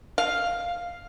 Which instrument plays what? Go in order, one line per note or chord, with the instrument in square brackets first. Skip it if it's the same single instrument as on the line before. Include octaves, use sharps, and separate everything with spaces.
[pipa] F5